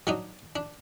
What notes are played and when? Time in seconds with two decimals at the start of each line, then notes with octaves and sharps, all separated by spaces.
0.07 F#3 D4 D#4
0.56 D4